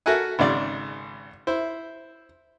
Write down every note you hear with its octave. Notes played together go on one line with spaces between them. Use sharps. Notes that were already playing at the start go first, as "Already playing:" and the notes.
F#4 A4 A#4 E5 F#5 G#5
G#1 G#2 C#3 D5
E4 C5